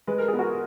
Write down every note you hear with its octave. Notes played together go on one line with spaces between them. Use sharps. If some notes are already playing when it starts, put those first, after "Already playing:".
G#3 B4
A#4
G#4
B3
F#4 A#4